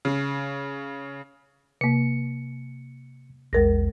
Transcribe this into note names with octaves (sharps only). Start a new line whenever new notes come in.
C#3
C3 A#3 C#7
A#1 E2 G#3 A#4 A#6